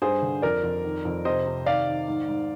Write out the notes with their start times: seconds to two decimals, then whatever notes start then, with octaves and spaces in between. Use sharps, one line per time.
0.02 G2 G#4 C5
0.22 D3
0.42 F2 A#4 D5
0.63 F2
0.84 D#3
1.05 F2
1.25 C3 C5 D#5
1.46 C3
1.66 D#3 D5 F5
1.87 D#3
2.08 G#2
2.28 G#2